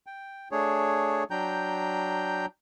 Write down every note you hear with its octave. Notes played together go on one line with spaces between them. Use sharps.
G5
A3 D4 G#4 C#5
F#3 D4 G5 A#5 G6